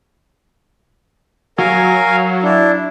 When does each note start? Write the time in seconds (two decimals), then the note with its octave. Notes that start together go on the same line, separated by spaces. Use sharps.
1.58 F#3 A#4 F5 G#5
2.43 D4 E4